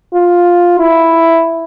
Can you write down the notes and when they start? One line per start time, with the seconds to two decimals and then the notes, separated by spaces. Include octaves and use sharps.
0.14 F4
0.79 E4